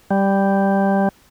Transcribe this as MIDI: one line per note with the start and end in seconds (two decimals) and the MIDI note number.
0.11 1.09 55